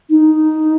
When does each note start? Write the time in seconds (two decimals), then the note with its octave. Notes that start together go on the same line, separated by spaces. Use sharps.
0.10 D#4